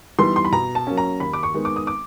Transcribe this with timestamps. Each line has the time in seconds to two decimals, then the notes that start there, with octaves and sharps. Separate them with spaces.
0.19 E3 G3 B3 D#4 C6
0.36 C6
0.45 B5
0.52 B2 A#5
0.75 A5
0.87 F#3 A#3 C#4
0.97 A#5
1.20 D#2 B5
1.33 D6
1.43 C#6
1.54 D#3 G#3 B3 D#4
1.65 D6
1.76 D#6
1.87 D6